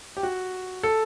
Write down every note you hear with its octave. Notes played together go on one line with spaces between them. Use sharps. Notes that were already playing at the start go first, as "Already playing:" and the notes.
G4
F#4
A4